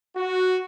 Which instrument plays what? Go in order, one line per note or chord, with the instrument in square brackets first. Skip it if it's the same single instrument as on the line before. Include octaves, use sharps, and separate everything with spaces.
[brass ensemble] F#4